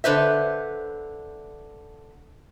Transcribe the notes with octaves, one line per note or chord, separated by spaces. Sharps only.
D3 B4 C5 E5